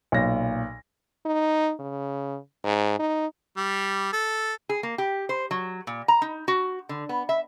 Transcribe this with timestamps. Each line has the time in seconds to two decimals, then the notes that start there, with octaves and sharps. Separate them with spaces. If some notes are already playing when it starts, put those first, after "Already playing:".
0.12 B1 A#2 A#6
1.25 D#4
1.80 C#3
2.64 G#2
2.99 D#4
3.57 G3
4.13 A4
4.69 G#4
4.83 A#3
4.98 G4
5.29 C5
5.51 F#3
5.87 A#2
6.08 A#5
6.22 D#4
6.48 F#4
6.89 D3
7.09 B3
7.29 E5